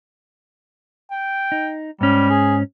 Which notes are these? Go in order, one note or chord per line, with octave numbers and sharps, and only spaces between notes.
G5
D#4
G#2 G3 C#4
G#4